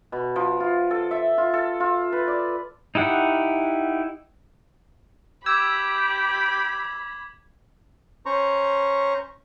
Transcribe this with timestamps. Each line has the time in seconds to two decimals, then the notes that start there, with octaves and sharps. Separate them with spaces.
0.12 B2
0.36 F3
0.60 F4
0.91 A4
1.11 E5
1.38 F4
1.53 A4
1.80 F4
2.12 B4
2.28 D5
2.95 D#4 E4 G4 F#5
5.46 G4 B5 D6 E6 G#6
8.26 C#4 C5 A#5 C#6